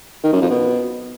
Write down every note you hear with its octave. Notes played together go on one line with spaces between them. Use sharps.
D#3
F#2
F2
B2